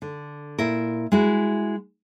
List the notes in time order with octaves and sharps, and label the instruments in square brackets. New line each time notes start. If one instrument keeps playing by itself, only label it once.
[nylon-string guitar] D3
A#2 E4 A#4
G#3 E4 F#4